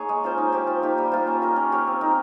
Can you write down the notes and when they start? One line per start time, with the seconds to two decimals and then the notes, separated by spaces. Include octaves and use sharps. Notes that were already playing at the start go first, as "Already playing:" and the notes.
Already playing: A#3 D#4 G#4 C#5
0.09 G#3
0.24 C#4 F4 C5
0.38 D#4
0.52 G4 C5
0.67 F3
0.82 A#3 D#4 G4
0.98 G3
1.12 A#3 F4 C5
1.27 C#4
1.42 F4 A#4
1.56 C#4
1.72 G4 C#5 F5
1.87 C4
2.01 D#4 A#4